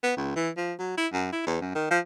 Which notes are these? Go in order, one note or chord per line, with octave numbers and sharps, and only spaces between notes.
B3
C#2
E3
F3
F#3
E4
F#2
E4
E2
F#2
D#3
F3